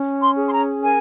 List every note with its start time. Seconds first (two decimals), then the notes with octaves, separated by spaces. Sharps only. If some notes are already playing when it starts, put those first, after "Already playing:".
Already playing: C#4
0.22 C6
0.37 G#4
0.48 C6
0.52 A#5
0.83 A#4 G#5